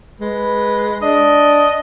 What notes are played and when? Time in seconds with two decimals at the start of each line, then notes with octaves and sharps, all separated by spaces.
0.21 G#3 B4
1.02 D4 D#5